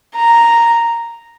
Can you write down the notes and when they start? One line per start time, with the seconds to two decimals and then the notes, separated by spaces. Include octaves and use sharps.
0.16 A#5